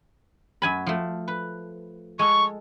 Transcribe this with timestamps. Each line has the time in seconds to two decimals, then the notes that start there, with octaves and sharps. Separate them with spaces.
0.62 F#2 G#5 B5
0.86 F3 A3
1.28 B4
2.19 G#3 A4 C#6